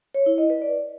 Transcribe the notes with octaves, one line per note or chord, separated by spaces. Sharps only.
C#5
E4
D#5
B4
D5